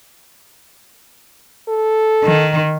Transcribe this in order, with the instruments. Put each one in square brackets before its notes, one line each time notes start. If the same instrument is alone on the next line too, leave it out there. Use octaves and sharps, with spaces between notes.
[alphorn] A4
[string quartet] D#3